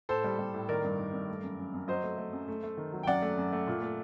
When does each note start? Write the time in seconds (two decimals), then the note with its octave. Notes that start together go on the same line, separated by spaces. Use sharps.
0.09 A2 A4 C5
0.24 G3
0.39 G3
0.54 A2
0.69 D#3 A#4 D5
0.84 G2
0.98 D#3
1.14 G2
1.29 A3
1.43 F#2
1.58 F#2
1.74 F#2
1.88 F#3 C5 D#5
2.03 A3
2.18 A3
2.33 F#2
2.48 A3
2.63 A3
2.77 D#3
2.93 F#3
3.03 G5
3.07 F#2 D5 F#5
3.22 A3
3.38 F#2
3.53 A3
3.68 A#2
3.82 A3